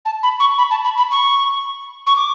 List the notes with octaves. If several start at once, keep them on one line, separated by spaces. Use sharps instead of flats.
A5
B5
C#6
B5
A5
B5
B5
C#6
C#6
D6